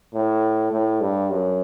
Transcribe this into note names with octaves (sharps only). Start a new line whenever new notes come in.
A2
A2
G2
F#2